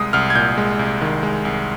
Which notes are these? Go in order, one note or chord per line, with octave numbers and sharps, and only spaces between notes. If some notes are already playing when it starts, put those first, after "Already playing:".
Already playing: C2 G#3 D#6
C2 F6
G#6
A#2 G6
G#3
C2
D#3
G#3
C2